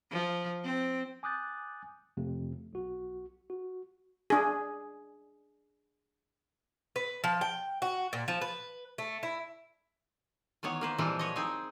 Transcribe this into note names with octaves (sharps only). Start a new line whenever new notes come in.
F3
C4
G#5 D6 D#6 F#6 G6 A6
F2 C3 A3
B1 F#4
F#4
D4 G#4
B4
F3
G5
F#4
A#2
F3
B4
A3
E4
D#3 E3 B3 C#5
A#3 B4 C5
A#2 E3 F3 G3 G#3 C4
B4 C#5 D#5
C4 D#4 G#4